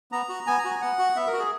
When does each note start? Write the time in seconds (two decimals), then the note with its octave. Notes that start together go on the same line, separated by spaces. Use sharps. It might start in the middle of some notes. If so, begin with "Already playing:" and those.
0.12 B3 A#5
0.29 F#4
0.47 B3 G#5
0.58 A#5
0.65 F#4 G#5
0.81 B3 F#5
0.99 F#4
1.16 B3 E5
1.27 A#4
1.33 F#4
1.39 G#4